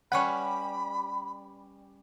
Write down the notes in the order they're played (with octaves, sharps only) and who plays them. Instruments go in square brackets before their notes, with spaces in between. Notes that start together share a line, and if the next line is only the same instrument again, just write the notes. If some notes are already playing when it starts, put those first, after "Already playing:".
[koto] G3 C#4 B4 [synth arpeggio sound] F#5 C#6 [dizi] B5